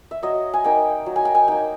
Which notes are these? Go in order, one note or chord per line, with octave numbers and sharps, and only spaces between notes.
E5
F#3 D#5
G#5
A#3 D#4 G5
F#3
G#5
G5
G#5
A#3 D#4 G5